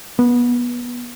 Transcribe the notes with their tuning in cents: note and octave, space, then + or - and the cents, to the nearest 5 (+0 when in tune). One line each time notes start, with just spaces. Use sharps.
B3 -25